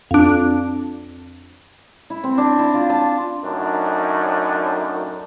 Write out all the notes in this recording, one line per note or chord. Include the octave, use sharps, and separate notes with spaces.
F2 D4
E4
C4
D4
E4
F4
A5
A5
F#2 A2 D4 D#4